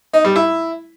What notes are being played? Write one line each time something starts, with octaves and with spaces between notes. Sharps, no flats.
D#4
G3
E4